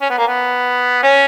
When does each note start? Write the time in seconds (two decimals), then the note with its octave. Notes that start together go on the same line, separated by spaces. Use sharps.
0.02 C#4
0.10 B3
0.18 A#3
0.28 B3
1.03 C#4